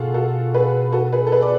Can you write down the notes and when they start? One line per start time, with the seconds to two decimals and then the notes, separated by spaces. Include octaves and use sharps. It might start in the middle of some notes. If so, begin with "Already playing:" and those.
Already playing: B2 F4 F#4 G#4 A4
0.14 F#4 A4
0.54 G#4 B4
0.92 F#4 A4
1.12 G#4 B4
1.27 A4
1.32 G#4 B4
1.42 D5